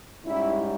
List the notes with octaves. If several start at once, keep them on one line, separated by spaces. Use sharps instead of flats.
G#2 G3 C#4 E4